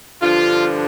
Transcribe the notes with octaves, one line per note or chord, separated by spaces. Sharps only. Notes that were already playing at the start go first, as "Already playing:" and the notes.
G2 D3 F3 F4